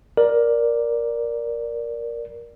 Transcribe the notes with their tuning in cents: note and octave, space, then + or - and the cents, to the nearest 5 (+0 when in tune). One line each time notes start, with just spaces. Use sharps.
A#4 +10 D5 +0